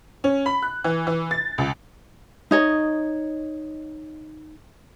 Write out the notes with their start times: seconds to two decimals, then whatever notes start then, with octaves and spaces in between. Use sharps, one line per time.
0.24 C#4
0.46 B5
0.63 F#6
0.84 E3
1.07 E3
1.31 A6
1.58 C#2
2.51 D#4 C#5 D#5